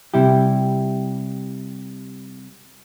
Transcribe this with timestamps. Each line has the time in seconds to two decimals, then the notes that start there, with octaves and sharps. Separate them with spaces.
0.14 C3 G3 E4 G4